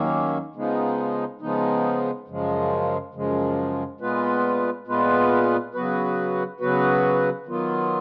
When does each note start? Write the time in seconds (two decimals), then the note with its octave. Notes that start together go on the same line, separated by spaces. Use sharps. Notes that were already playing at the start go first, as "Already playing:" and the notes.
Already playing: D#2 D#3 F#3 A#3 C#4
0.55 C#3 F3 G#3 B3 D#4
1.41 C#3 F3 G#3 B3 D#4
2.28 F#2 C#3 F3 G#3
3.14 F#2 C#3 F3 G#3
4.01 A#2 G#3 B3 F4 B4
4.87 A#2 G#3 B3 F4 B4
5.74 C#3 F#3 B3 F#4 B4
6.60 C#3 F#3 B3 F#4 B4
7.46 D#3 F#3 B3 F4